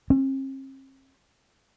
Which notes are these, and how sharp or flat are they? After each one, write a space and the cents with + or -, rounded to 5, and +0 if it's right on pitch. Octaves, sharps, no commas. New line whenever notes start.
C4 +45